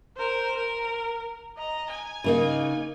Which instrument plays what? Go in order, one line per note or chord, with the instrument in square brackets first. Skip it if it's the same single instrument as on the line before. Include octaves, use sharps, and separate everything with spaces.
[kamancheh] A#4 C5
A#4
D#5 A#5
G#5
[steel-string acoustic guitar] C#3 A#3 D#4